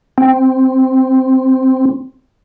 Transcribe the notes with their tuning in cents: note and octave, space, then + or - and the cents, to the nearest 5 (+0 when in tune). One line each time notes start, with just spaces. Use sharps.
C4 -5